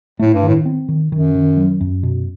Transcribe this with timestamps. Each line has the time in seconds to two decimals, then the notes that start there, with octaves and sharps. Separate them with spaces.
0.19 A2 A3
0.34 G2
0.43 A2 D#3
0.66 C4
0.89 D#3
1.12 F#2 D#3
1.35 D#3
1.57 F#3
1.81 F#2
2.03 B2